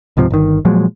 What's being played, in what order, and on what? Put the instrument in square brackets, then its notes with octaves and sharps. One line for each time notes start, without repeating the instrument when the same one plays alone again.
[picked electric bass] C#2 G#2 C3 F3
G1 D#3
A#2 F3 F#3 G#3